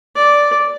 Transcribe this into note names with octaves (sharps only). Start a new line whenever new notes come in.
D5